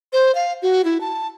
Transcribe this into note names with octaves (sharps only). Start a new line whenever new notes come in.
C5
F5
F#4
E4
A5